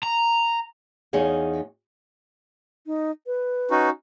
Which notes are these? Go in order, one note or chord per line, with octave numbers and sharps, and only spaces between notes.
A#5
E2 D#4 G#4 C#5 F5
D#4
B4
C#4 D#4 F#4